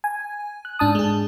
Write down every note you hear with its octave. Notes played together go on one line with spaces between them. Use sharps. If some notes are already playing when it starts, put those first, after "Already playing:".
G#5
F#6
G#2 D4 A5 D#6
G#3 G#4